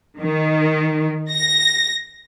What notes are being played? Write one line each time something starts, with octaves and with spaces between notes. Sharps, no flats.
D#3
A#6